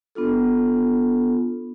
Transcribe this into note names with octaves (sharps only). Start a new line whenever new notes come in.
B3 D4 F4 A4